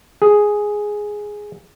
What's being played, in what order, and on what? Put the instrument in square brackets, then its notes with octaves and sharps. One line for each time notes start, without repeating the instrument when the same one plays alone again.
[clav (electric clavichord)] G#4